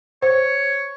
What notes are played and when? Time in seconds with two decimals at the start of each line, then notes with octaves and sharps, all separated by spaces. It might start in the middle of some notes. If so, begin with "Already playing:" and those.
0.22 C5 C#5